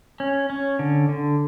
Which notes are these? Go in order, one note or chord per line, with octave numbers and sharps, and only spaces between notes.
C#4
C#4
D3
D3